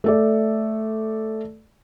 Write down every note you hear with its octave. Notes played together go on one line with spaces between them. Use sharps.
A3 A4 D5